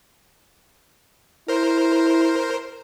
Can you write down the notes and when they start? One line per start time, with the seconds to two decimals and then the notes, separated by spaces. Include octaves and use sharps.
1.48 E4 A#4 C5